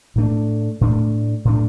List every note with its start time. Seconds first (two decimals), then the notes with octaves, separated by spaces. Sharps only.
0.16 A2 A3 D4
0.81 A2 A3 D4
1.45 A2 A3 D4